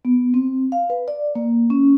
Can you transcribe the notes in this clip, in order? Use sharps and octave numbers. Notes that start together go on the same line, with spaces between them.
B3
C4
F5
B4
D5
A#3
C#4